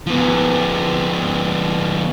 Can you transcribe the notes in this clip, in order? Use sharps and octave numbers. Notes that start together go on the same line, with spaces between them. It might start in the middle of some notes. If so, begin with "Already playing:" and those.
F3 B3